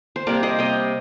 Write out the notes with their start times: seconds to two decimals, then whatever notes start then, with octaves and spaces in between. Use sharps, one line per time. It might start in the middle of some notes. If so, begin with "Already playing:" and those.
0.16 C5
0.27 C3 G3 A#3 A#4 D5
0.43 C5 D#5
0.59 C3 G3 A#3 D#5 G5